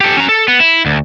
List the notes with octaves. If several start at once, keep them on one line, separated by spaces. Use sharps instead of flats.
G4 A4
C#4 A#5
A4
B3
E4
D2